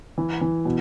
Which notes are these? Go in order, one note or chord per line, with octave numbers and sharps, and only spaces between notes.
E3
E3
B2